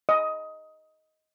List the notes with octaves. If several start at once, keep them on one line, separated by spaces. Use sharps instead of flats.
D#5